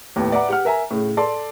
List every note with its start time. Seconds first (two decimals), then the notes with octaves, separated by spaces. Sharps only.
0.16 D#2 A2 B3
0.32 B4 D5 E5 F#5 A#5 D6
0.49 G4 F#5 F6
0.65 A#4 E5 G#5 A#5
0.90 A2 C#3
1.17 A4 D5 C6